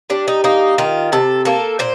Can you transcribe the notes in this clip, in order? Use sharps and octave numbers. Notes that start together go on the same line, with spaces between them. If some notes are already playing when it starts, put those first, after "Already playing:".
G3 D4
D#4
A#3 D#4
D#3 F4
C3 A4
A#3 A4
A#2 C5